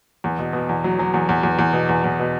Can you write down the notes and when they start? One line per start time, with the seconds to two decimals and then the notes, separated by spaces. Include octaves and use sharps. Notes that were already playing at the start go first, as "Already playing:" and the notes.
0.24 E2
0.39 B2
0.53 B2
0.69 E2
0.84 F#3
0.99 F#3
1.14 E2
1.29 E2
1.43 E2
1.59 E2
1.73 B2
1.89 E2
2.04 E2
2.19 B2